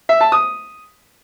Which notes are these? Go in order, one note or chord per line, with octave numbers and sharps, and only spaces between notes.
E5
A5
D#6